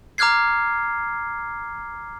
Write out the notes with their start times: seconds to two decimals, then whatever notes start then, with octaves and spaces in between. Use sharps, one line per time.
0.18 A#5 D6 F6 F#6 G#6 C7